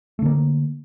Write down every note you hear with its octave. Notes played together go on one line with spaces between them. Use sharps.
D3 A3 A#3